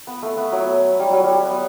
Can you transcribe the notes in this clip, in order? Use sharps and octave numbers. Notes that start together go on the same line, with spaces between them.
B3
A3
B3
F#3
G3
F#3
G3
B3